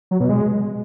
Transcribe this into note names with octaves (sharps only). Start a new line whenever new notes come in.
F#3
B2
G#3